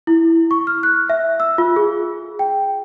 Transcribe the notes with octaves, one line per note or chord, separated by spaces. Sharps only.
E4
C#6
F6
F#6
E5
E6
F4
G#4
G5